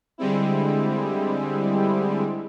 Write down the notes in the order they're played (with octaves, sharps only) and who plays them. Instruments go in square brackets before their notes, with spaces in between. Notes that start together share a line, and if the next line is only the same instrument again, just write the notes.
[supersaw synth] D3 G3 G#3 C4 E4